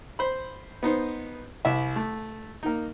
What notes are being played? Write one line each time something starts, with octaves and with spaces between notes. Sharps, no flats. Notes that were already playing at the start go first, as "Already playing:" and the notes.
C5 B5
B3 D#4 C5
C2 E5
A3
A#3 D#4